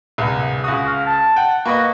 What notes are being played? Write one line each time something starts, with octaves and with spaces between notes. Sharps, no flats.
D1 C2
C#2 F#4 D#6
F5
A5
F#5 G5
A#3 F#4 B4 D#5